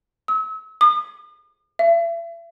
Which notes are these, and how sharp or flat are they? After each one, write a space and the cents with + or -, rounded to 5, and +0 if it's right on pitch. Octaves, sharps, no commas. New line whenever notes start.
E6 -40
D#6 -45
E5 +40